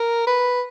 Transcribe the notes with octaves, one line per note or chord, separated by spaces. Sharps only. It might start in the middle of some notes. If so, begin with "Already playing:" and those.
Already playing: A#4
B4